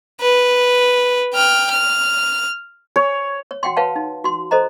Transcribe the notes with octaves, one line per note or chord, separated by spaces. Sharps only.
B4
G5 F6
F6
C#5
C#5
F#4 F#5 G5 C6
B4 C#5 F5 F#5 A5
D#4
F#4 C6
A4 C5 D#5 A#5